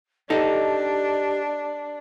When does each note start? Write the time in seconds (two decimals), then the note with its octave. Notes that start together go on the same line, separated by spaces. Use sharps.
0.30 D4 D#4 G4 A4